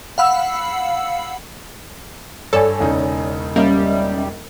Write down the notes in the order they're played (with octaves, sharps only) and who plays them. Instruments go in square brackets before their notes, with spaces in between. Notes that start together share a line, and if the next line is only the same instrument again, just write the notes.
[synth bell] F5 F#5 B5 E6
[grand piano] G2 [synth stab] A4 [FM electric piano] C#5 D5 G#5
[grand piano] E1 C#3 D#4
[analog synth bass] G3 [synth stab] A#3 [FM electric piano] C#4 D#5 E5